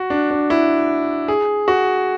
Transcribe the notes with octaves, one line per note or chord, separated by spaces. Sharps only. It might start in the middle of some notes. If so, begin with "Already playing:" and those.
Already playing: F#4
D4
D4
E4
G#4
F#4